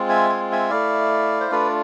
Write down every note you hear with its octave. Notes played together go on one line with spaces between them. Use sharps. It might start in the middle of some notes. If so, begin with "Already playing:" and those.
Already playing: G#3 C4 F4
E5 G#5
G#5
E5 G#5
A3 E4 D5 F5
C5
A3 D4 F4 B4 D5